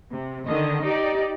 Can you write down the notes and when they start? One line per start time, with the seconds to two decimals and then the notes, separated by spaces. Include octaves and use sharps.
0.11 C3
0.47 D3 D#3 D#5
0.84 D#4 G4 D5